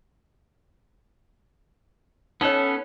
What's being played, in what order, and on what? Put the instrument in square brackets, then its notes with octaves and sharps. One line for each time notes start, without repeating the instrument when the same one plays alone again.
[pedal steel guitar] B3 C#4 A4 [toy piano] D#4 C#5